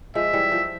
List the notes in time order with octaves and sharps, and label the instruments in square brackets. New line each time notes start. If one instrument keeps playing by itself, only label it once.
[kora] F3 G#3 [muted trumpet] E5
[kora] E3 G3
F3